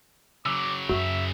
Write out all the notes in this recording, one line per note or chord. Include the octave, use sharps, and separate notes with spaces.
C#3 F#3 D6 E6
F#2 F#4 E5